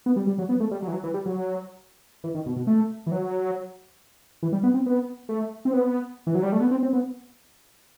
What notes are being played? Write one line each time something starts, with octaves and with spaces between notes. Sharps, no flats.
B3
G3
G3
F#3
B3
A3
G3
F#3
E3
F#3
E3
G3
F#3
E3
D#3
B2
B2
A3
E3
F#3
E3
G3
B3
C4
B3
A3
C4
B3
E3
F#3
G3
A3
B3
C4
C4
B3